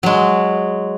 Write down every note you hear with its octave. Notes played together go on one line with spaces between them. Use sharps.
F#3 G#3